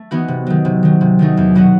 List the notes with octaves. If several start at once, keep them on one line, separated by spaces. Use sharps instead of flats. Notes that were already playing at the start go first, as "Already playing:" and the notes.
Already playing: A3
E3 B3 D#4 F#4
C3
D#3 F#3
C3
D#3 F#3
C3
D#3 F#3 A3 D#4
E2
B2 F#3 B3 F#4